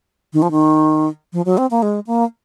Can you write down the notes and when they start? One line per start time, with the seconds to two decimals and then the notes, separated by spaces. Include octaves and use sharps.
0.33 D#3
0.42 F3
0.51 D#3
1.33 F3
1.46 F#3
1.58 C4
1.71 A#3
1.82 G#3
2.07 A#3